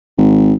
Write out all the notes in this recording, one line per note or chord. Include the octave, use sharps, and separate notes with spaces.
G#1